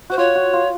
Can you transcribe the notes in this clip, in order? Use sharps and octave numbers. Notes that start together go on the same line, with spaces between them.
F#4 C5
F4 C#5
F#4
F4